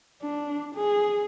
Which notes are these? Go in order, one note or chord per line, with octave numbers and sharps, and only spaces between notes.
D4
G#4